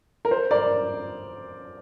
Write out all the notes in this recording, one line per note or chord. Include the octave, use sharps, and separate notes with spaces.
A#4
C5
A#4 D5